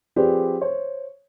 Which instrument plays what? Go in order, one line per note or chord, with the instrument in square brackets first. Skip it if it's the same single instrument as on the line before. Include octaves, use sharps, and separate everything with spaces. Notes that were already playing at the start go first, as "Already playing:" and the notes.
[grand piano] F3 C4 G4 G#4 B4 D5
C5 C#5